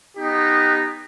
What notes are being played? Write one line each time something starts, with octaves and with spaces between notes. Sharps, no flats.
B3 D#4 G4